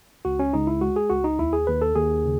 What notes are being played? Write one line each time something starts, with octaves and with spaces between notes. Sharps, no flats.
C#2 F#4
C#4
C#2 D#4
E4
G#3 F#4
G#4
C#2 F#4
D#4
D#2 E4
G#4
D#2 B4
A4
D#2 G#4
C#3